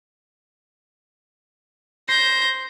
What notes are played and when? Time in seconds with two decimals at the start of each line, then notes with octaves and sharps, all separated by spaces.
2.09 C5 G6 A#6